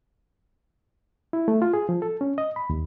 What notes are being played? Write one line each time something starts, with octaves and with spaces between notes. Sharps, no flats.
E4
A3
F4
G#4
F3
A4
C#4
D#5
B5
D#2